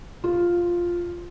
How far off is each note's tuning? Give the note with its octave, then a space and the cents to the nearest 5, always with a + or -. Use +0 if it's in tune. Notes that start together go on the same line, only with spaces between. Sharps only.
F4 +0